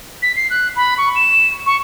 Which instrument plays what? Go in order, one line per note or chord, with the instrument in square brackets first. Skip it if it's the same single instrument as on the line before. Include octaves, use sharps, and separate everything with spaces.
[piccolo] B6
C7
F#6
B5
C#6
E7
C#6